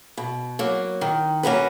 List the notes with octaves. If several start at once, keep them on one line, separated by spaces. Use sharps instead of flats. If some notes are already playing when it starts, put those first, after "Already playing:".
B2
F#3 A#3
D#3
A#3 C#4 F#4 B4